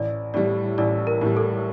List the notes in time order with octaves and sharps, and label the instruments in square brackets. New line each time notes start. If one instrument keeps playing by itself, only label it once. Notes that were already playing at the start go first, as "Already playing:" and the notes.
Already playing: [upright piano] A1 [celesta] D5
[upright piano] A2 G3 [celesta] D5
[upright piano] A1 [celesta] D5
[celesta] A#4
[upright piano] A2 G3
[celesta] A4